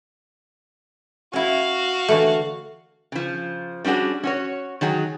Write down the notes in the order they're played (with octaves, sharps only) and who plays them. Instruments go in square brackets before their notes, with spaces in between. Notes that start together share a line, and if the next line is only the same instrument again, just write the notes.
[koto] C#4 E4 [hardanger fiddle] F#4 F5
[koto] D3 E3 A3
[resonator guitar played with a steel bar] C#3 F3
G3 C#4 D4 F#4 G#4
C#4 F#4 C#5
D#3 F#3 G#4